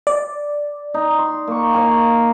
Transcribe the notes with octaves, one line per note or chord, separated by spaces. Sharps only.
D5
D#4
C6
A#3 C#6
C#5 F5 G#5